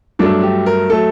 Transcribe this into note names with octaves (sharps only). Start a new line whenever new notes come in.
G2 F#3 A3 D4
G4
A#4
F#3 A3 A4